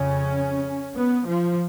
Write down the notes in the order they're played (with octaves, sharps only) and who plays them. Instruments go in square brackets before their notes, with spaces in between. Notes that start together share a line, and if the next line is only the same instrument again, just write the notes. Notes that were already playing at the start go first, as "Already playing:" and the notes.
Already playing: [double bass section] F2 C#3 C#4
B3
F3